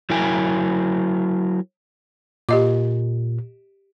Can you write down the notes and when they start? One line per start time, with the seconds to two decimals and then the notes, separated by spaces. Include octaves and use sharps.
0.10 F#3 E4 A#4 G5 G#5
2.49 A#2 G4 D#5 D6